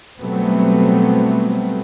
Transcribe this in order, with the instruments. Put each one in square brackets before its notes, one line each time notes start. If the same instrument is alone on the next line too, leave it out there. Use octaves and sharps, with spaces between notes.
[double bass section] B2 F#3 G3 A3 B3 C4